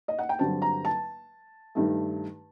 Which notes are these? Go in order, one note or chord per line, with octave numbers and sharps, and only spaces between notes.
D#5
F#5
G5
G2 D3 F#3 C4 A5
A#5
A5
G2 D#3 A3